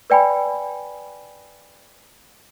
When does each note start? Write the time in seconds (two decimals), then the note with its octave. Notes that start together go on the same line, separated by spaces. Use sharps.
0.10 B4 D5 G5 G#5 B5